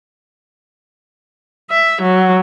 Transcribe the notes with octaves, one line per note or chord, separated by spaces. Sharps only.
E5
F#3